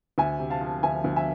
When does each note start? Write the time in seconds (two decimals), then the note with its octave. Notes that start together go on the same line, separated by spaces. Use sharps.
0.18 D2 E5 G#5
0.39 C3
0.50 F5 A5
0.61 F3
0.83 D2 E5 G#5
1.04 D2
1.16 E5 G#5